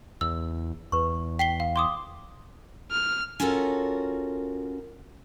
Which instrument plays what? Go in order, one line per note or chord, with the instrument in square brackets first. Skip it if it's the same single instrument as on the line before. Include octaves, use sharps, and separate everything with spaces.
[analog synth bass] E2 [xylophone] E6
[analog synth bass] E2 [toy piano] B4 C#6
[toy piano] G5 [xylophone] B6 C7 G7
[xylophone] F5
C6 D6 D#6
[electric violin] F6
[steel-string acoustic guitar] C#4 F4 F#4 A4 A#4